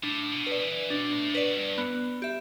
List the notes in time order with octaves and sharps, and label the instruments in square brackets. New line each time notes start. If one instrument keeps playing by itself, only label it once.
[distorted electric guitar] A2 [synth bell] D4
[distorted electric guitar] B2
[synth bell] B4 D5
[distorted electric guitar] E3
[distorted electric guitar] B2 [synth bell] D4
[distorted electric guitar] A2
[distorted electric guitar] B2 [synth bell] B4 D5
[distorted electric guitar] G2
[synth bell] B3
G4 E5